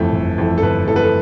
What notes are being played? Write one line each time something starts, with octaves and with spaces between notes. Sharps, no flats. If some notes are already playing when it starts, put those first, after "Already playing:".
Already playing: G1 F2 E3 A3
G1
F2 E3 A3
A4
G1 B4
F2 E3 A3 A4
B4
A4